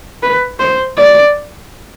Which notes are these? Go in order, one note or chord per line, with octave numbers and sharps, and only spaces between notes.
B4
C5
D5